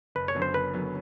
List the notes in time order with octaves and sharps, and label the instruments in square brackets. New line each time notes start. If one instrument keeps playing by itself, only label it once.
[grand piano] F#1 [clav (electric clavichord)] B4
[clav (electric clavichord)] C#5
[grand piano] F#2 D3 F#3 B3
[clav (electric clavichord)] C5
[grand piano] F#1 [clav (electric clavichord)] B4
[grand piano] F#2 D3 F#3 B3